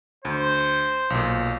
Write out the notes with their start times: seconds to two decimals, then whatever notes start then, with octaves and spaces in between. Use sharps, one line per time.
0.25 D2 C5
1.10 B1 A#2